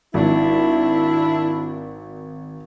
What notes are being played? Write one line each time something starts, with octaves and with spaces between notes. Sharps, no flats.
G#1 D4 E4